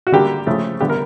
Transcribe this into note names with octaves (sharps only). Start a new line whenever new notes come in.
F#4
D3 G3 A#3 G4
C#3 F3 A3
D3 G3 B3 G4
A#4